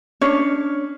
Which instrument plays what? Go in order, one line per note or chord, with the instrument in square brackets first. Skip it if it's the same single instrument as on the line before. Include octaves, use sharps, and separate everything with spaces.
[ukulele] C#4 D4 C#5